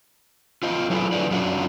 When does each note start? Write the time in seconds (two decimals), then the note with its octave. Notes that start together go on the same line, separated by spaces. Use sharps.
0.63 F4 C5 D#5
0.90 F#3 E4 G#4 A4 B4
1.12 D3 F#3 G#4 B4 D5
1.31 F#2 F#3 C#4 D4 F4 F#4